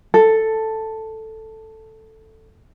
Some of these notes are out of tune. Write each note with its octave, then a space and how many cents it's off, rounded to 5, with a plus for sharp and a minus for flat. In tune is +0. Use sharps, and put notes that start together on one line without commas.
A4 +5